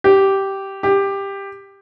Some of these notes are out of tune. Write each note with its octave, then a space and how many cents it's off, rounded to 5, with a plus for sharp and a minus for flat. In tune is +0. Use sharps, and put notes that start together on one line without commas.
G4 -10
G4 +10